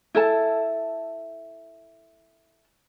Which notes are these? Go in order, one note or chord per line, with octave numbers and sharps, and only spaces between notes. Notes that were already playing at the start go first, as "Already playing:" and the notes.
E4 A4 A5